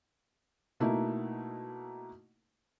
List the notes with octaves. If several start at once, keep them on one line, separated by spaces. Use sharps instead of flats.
B2 A3 A#3 D#4 E4